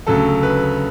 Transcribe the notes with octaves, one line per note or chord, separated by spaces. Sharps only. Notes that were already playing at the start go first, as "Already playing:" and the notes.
D2 C#3 F#3 A3 A4
B4